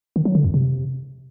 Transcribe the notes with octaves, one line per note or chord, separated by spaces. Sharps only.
D#3
F#3
D3
F2
C3